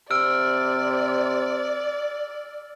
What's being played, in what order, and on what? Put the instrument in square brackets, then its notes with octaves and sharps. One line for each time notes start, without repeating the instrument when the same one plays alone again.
[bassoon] C3 [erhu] D5 [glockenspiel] E6 F6 D7